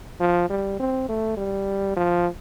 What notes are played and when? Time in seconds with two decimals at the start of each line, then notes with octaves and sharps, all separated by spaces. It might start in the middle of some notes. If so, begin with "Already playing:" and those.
0.20 F3
0.50 G3
0.80 C4
1.09 A3
1.37 G3
1.96 F3